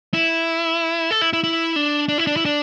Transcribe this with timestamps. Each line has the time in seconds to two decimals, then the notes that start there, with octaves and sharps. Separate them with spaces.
0.14 E4
1.11 A4
1.21 E4
1.33 E4
1.44 E4
1.76 D4
2.09 D4
2.18 E4
2.27 D4
2.36 E4
2.45 D4